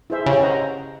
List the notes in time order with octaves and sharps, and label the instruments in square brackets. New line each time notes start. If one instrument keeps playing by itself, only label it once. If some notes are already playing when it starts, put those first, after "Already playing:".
[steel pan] E4 G#4 C5 E5
[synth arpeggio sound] C#3 [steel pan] G4
[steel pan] C5 D#5 F#5 A#5